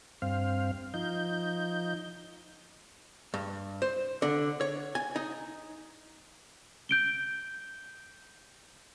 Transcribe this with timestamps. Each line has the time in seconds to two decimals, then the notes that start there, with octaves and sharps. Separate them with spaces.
0.22 G2 C4 F5
0.94 F3 D#4 G6
3.34 G2
3.82 C5
4.22 D3
4.61 C#5
4.95 G#5
5.16 D#4
6.89 G6 D7 G7